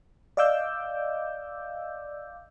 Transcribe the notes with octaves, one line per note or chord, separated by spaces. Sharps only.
D5 D#5 F5 D6 E6 G6